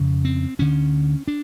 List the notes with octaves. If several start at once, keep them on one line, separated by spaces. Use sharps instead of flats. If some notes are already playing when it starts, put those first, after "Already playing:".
Already playing: F2 C#3
C4
D2 D3 C#4
D4